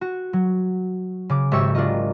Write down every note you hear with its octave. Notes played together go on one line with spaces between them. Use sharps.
F#4
F#3
C#3 D6
G#1 G4 C#5 E5 C#6 E6
D4 F4 A#4 D#5